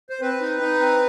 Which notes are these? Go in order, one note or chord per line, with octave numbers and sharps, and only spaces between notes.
C5
C4 B4
D#4
D#4
C4